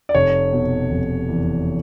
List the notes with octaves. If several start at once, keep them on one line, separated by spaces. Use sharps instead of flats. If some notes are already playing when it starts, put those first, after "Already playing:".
D5
F1 C#5
B2
F1
E2